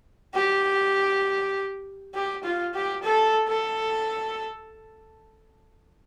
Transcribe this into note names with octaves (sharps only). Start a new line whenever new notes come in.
G4
G4
F4
G4
A4
A4